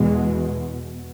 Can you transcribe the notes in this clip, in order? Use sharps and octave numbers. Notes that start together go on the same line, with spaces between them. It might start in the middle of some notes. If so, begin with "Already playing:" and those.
Already playing: E2 B2 E3 G#3